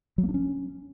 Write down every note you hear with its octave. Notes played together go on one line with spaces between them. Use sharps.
F#3
A#3
D4
C#4